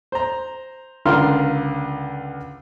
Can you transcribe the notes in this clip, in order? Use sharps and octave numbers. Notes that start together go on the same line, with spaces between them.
C5 A#5
C#2 D3 F4 A#4 C6 F6